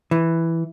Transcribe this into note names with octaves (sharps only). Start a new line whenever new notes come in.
E3